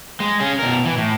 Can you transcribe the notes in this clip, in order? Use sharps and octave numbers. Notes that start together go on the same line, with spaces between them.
G#3
C#4 G#4
B2 A#4
E3
A2